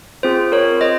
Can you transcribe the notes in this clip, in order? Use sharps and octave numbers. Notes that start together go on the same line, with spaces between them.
C4 F4 G#4 C5
A#4 C#5
C5 D#5